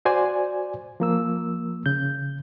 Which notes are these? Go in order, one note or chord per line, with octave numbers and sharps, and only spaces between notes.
F#4 C5 D5 G#5
F3 A#3 E6
C#3 G6